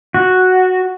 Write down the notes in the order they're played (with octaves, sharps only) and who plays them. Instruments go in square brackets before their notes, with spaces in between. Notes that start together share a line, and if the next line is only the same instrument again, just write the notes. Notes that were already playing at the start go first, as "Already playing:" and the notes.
[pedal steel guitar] F#4